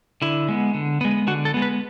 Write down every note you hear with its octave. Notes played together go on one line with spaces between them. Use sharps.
D3 E4
G#3 B3
D3
G#3 B3
D3 F#4
A4
G#3 B3
B4